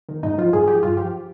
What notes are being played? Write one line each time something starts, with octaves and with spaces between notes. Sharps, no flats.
D#3
G#2 D#4
F3 F4
G#2 G#4
F3 G4
G2 F4
F3 G4